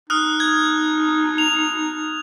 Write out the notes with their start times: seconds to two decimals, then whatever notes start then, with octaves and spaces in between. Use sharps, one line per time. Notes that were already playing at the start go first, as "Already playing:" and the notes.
0.10 D#4 D#6 F6 F#6
0.40 G#6
1.38 F7